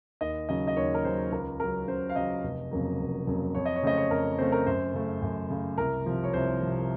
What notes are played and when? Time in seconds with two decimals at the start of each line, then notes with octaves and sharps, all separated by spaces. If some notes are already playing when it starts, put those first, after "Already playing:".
0.21 D#2 D#5
0.49 C#3 F#3 D#5
0.67 D#5
0.76 D#2 C#5
0.94 A#4
1.04 C#3 F#3 C5
1.32 C#2 A#4
1.60 C#3 F#3 A#4
1.88 C#2 C5
2.09 F5
2.16 C#3 F#3 D#5
2.43 F1
2.71 F2 C#3 F#3 A#3
2.99 F1
3.27 F2 C#3 F#3 A#3
3.55 F2 C#5
3.66 D#5
3.76 C#5
3.83 C#3 A3 C4 D#5
3.97 C#5
4.11 F2 A#4
4.38 C#3 A3 C4 C5
4.52 A#4
4.66 F#2 C5
4.94 C#3 A3
5.22 F#2
5.50 C#3 A3
5.77 C2 A#4
6.06 C3 F3
6.24 C#5
6.33 C2 C5
6.61 C3 F3